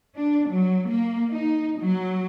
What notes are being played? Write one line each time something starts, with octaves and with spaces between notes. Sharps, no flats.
D4
F#3
A#3
D#4
F#3